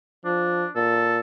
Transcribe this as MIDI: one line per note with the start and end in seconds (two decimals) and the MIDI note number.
0.25 0.65 53
0.25 0.70 62
0.75 1.20 46
0.75 1.19 69